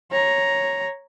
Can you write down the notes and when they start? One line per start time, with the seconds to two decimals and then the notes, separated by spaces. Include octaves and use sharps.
0.12 C#5 A#5